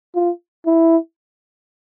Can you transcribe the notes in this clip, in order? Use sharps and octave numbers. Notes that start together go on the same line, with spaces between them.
F4
E4